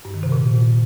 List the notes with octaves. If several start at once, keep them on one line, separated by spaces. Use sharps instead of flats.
G2
D#3
C3
A#2